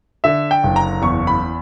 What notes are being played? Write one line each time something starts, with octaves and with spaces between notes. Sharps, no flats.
D3 E5
G5
F#1
A#5
E2 C#6
B5